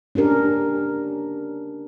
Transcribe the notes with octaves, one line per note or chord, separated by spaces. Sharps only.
C#4 D4 G4 A#4